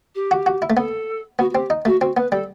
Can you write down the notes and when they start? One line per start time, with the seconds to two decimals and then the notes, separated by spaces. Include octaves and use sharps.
0.15 G4
0.31 F#4
0.46 F#4
0.62 E4
0.70 A3
0.77 B3 A4
1.39 B3 F#4
1.50 F#4
1.54 C4 G4
1.70 D#4
1.85 A3 F#4
2.00 C4 F#4
2.16 B3 B4
2.32 G3 A4